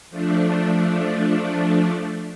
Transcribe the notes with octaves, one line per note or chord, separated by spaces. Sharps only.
F3 A3 D4